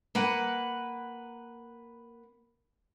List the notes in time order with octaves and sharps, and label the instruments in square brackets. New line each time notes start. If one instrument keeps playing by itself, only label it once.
[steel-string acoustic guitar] A#3 B4 F#5